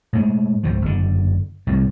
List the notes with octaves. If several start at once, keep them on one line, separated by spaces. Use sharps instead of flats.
A2 G#3
C#2 G#2 F3
F#1 D3
C2 A2